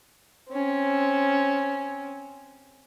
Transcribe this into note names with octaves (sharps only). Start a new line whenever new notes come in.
C4 C#4